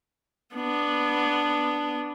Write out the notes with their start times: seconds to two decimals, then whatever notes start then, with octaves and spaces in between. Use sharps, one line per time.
0.55 B3 D4